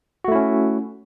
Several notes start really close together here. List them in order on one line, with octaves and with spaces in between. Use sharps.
F#4 A3 E4 C#4